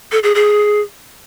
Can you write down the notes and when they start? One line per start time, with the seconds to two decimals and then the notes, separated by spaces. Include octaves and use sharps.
0.12 A4
0.23 G#4
0.35 G#4